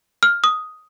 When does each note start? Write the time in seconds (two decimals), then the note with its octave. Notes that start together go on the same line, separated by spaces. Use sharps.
0.23 F6
0.44 D#6